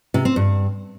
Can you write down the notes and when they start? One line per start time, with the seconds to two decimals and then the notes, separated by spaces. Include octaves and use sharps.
0.14 C3
0.25 C4
0.36 G2